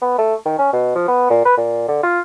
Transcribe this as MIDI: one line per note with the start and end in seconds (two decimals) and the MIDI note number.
0.02 0.14 59
0.18 0.35 57
0.45 0.58 51
0.58 0.72 61
0.73 0.90 47
0.95 1.06 53
1.08 1.30 59
1.30 1.41 46
1.45 1.56 71
1.57 1.84 46
1.88 2.00 50
2.03 2.20 65